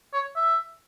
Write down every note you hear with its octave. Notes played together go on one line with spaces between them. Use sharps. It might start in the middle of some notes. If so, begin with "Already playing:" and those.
C#5
E5